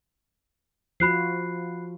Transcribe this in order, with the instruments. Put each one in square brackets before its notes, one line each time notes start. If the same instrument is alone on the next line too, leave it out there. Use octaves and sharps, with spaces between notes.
[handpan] F3 F4 F#4 [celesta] B5 F#6 C7